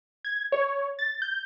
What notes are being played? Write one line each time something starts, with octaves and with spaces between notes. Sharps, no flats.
G#6
C#5
A6
G6